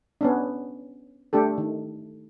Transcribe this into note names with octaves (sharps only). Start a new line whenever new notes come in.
B3 C#4 D4
A3 D4 G4 A4
D#3